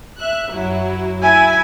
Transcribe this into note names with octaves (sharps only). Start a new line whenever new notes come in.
E5 F#6
F#2 F#3 E4
E4 E5 G#5